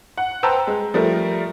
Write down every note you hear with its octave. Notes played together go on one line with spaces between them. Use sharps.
F#5
B4 C5 G5 A5 A#5 E6
G#3
F3 G3 A3 A#4